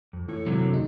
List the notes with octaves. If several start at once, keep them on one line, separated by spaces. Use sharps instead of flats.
F2
A2 E3 C#5
F#2 C3 D#3 F#3 G#3
E3 D4 A4
D#2 C#3 C4 D#4